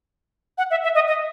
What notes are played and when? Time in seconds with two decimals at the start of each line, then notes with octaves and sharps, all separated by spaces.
0.58 F#5
0.71 E5
0.83 E5
0.95 D#5
1.07 D#5